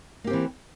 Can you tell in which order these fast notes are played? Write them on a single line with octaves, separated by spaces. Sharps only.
A#3 G4 C4 E3